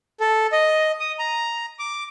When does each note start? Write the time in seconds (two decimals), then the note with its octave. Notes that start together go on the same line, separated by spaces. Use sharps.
0.20 A4
0.52 D#5
1.00 D#6
1.19 A#5
1.79 D6